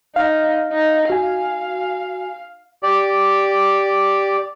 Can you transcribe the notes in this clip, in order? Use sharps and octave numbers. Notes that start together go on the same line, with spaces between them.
D#4 F5
D#4
F#4 F5 G#5
G4 D5